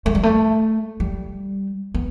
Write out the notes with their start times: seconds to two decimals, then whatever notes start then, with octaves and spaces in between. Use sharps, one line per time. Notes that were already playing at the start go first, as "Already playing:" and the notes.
0.06 A3
0.15 G3
0.23 A3
1.00 G3
1.94 B3